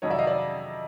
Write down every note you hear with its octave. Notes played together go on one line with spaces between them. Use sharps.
F2 C3 D#3 F#3 C#5 D#5
D5 E5
D#5 F5
D5 E5